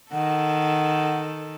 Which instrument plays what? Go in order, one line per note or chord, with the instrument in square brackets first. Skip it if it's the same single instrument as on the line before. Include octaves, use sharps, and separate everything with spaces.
[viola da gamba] D#3 A4 [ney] F#5